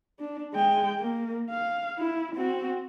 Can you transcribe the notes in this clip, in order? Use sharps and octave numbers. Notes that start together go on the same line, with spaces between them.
D4
G#3 G5
A#3
F5
E4
C4 F#4